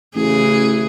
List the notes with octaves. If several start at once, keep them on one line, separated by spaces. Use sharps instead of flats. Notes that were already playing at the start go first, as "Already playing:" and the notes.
A1 C#3 E3 G#4